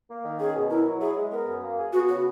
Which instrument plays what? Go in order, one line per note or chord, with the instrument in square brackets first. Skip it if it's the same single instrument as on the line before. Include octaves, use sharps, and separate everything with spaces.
[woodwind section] A#3
D#3
[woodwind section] C#4 [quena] G#4
[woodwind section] B2
[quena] E4 [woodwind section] A#4
[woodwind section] F#3
[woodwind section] E4 [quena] G#4
[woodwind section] G#3
[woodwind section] B3 [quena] A#4
[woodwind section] F#2
A#3
G#4
[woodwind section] B3 [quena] F#4
[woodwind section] C#3 [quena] F#4